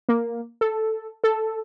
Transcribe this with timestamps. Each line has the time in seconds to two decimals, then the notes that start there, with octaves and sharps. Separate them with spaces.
0.09 A#3
0.61 A4
1.24 A4